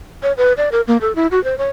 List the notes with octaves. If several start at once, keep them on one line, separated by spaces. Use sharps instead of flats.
C#5
B4
D5
A#4
A#3
A4
E4
F#4
C5
C#5